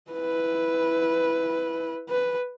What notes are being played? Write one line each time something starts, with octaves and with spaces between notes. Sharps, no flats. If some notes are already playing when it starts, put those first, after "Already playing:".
E4 B4
B4